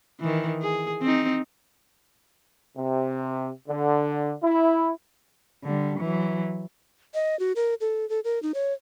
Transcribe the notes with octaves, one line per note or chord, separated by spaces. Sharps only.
D#3 E3
G#4
C4 D#4
C3
D3
E4
D3 G3
E3 F#3
D#5
F#4
A#4
A4
A4
A#4
D#4
C#5